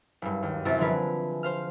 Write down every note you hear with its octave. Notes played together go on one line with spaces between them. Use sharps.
F#1 G2
D#2
F#2 C3 F#3 E4 A6
D3 F3 G#4 A#4 B4
C5 F5 F6